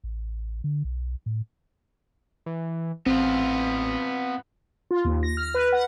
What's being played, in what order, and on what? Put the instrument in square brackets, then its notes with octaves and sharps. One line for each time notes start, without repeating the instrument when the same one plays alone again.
[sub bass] A1
D3
B1
A2
[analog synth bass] E3
[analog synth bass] A1 [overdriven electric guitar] B3 F4 [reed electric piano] C4
[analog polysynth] F4
D#2
A#6
F6
B4
F#5